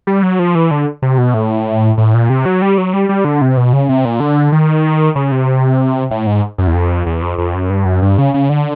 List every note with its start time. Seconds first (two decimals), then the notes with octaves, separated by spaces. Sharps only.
0.07 G3
0.23 F#3
0.39 F3
0.55 E3
0.71 D3
1.02 C3
1.18 B2
1.34 A2
1.98 A2
2.14 A#2
2.30 C3
2.46 F#3
2.62 G3
2.78 F#3
2.93 G3
3.09 G3
3.25 D3
3.41 C3
3.57 B2
3.73 C#3
3.89 C3
4.05 A#2
4.20 D3
4.52 D#3
5.16 C#3
5.32 C3
6.11 A2
6.27 G#2
6.58 F#2
6.67 E2
6.74 F2
7.06 E2
7.22 F2
7.38 F2
7.54 F#2
7.70 G2
7.85 F#2
8.02 G2
8.18 C#3
8.34 C#3
8.49 D3